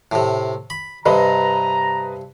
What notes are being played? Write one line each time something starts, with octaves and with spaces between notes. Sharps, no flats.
A2 C3
B5
G2 C3 B4 D#5 A#5 B5